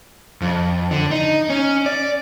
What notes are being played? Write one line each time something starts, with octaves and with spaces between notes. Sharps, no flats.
F2
D3
D#4
C#4
D5